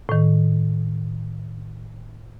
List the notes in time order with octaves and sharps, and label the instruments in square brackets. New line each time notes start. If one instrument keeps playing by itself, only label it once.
[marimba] A2 D#3